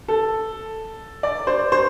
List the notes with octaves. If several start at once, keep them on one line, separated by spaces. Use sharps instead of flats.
A4
D5
C5
C5